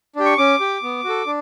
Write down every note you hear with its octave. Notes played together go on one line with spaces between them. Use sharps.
D4 G4
C#6
C#4 D6
G4
B3
F#4 A4
D4